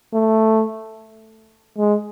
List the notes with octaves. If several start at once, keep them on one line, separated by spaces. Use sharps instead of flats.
A3
G#3